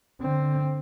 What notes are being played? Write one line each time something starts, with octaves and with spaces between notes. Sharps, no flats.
D3 C4